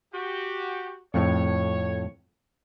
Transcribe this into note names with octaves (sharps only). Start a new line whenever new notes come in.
F#4 G4
F2 A2 C#5